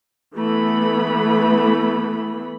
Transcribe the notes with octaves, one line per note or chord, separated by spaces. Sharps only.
E3 A3 B3 B5